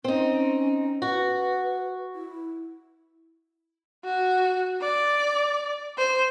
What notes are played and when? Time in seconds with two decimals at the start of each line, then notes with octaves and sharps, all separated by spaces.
0.04 C4 C#4 D#4
1.02 F#4 B4
2.15 E4
4.05 F#4
4.81 D5
5.98 C5